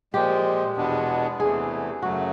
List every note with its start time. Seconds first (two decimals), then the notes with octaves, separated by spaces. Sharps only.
0.13 A#2 F3 G#3 G4
0.77 E2 B2 G#3 B3 D4
1.40 E2 C3 E3 A3 G#4
2.02 F#2 C#3 F#3 A3 F#4